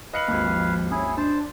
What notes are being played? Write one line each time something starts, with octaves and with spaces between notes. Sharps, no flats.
B4 D#5 F5 C#7 F#7
G#1 D#2
F3
C#4 E4 G#4
D4 C5 A5